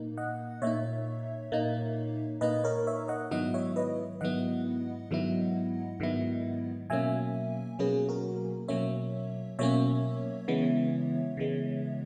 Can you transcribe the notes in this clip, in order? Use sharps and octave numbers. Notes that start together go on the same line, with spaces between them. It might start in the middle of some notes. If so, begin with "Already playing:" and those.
Already playing: A#2 A#3 D#4
D#5 F#5
A#2 A#3 D#4 C#5 E5
A#2 A#3 D#4
A#2 A#3 D#4 B4 D#5
A#4 C#5
C#5 E5
D#5 F#5
G#2 D#3 F#3 B3 E4 D#5 F#5
C#5 E5
B4 D#5
G#2 D#3 F#3 B3 E4 D#5 F#5
G#2 D#3 F#3 B3 E4
G#2 D#3 F#3 B3 E4
B2 F#3 A#3 C#4 E5 G#5
B2 F#3 A#3 C#4 G#4 B4
F#4 A#4
B2 F#3 A#3 C#4 C#5 E5
B2 F#3 A#3 C#4 C#5 E5
C#3 E3 G#3 B3
C#3 E3 G#3 B3